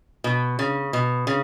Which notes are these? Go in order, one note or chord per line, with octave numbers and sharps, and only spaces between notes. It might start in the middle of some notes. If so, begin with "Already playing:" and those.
B2
C#3
B2
C#3